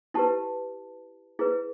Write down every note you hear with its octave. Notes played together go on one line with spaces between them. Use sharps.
E4 G4 B4 A5
E4 G#4 B4